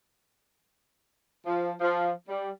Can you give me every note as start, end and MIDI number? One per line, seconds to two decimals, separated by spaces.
1.45 1.71 53
1.80 2.10 53
2.28 2.49 55